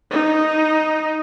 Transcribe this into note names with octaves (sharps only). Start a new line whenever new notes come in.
D#4